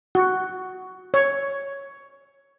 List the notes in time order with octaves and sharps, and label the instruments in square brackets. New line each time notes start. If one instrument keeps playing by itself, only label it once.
[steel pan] F#4
C#5